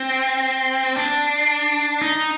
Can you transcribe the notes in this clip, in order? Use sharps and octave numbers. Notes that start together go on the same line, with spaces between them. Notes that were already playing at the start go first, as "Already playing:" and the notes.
Already playing: C4
D4
D#4